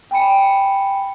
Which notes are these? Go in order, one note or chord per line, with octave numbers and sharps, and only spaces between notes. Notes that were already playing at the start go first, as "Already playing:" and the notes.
G5 G#5 B5 C#7